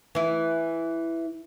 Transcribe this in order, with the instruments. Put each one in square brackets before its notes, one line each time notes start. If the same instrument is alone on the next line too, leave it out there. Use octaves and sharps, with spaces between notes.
[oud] E3 E4